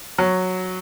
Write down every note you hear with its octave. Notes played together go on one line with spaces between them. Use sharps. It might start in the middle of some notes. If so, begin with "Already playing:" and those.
F#3